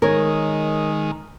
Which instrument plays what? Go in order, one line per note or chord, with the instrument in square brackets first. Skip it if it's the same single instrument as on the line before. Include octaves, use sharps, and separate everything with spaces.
[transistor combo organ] D#3 G#3 [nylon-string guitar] A#4 C#5